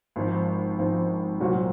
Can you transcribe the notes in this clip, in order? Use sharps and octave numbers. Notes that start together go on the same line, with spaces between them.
G#1 G#2 F3 C4 D#4
G#1 G#2 F3 C4 D#4
C2 A#2 F#3 C4 F#4